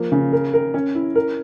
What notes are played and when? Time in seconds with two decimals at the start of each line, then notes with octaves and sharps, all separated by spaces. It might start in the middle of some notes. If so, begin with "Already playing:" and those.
Already playing: F3 A#3
0.12 C#3
0.33 A#4
0.53 A#4
0.74 C#4
0.95 E4
1.15 A#4